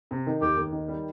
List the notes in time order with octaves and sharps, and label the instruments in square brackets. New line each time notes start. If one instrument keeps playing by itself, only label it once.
[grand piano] C3
D#3
[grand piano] D#2 [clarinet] G4
[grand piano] D#2
D#3
G3